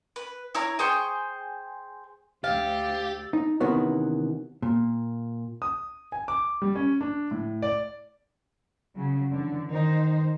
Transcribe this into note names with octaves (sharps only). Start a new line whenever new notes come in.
B4
E4 C#5 A#5
G#4 C5 G5 C#6
D2 G4 F5 E6 A6
D#4
C3 D#3 E3 B3 C#4 F#4
A#2
D#6
G#5
D6
G3
C#4
D4
A2
D5
C#3 F#3
D3 E3
D#3 D#4 C5